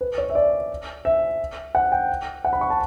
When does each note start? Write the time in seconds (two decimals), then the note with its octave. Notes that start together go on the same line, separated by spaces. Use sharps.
0.01 B4
0.18 C#5
0.30 E5
0.35 D5
1.05 E5
1.75 F#5
1.92 G5
2.45 F#5
2.53 B5
2.61 C#6
2.70 A5